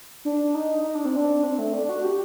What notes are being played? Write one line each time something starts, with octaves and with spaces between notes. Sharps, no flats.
D4
D#4
D#4
D4
C4
D4
C4
A3
D4
F#4
G4